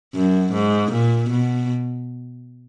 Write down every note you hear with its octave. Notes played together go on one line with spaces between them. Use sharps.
F#2
G#2
A#2
B2